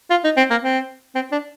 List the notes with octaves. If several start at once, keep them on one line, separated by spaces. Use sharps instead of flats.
F4
D#4
C4
A#3
C4
C4
D4